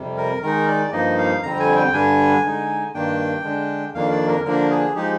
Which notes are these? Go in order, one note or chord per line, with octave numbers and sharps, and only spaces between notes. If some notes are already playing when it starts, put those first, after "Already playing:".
Already playing: F2 C3 G3
A#4
D#3 G#3 D#4 A#4
D5
G2 F3 A#3 D#4 D#5
F5
F2 D3 G3 C4 A#5
G#5
G5
G2 D3 G3 D4 G#5
D3 G#3 D#4
G2 D#3 A#3 D4 G5
D3 G#3 D4
F2 D#3 A#3 D4 F5
D5
A#4
D3 F3 A#3 D4 A#4
G#4
F3 G#3 D#4 G4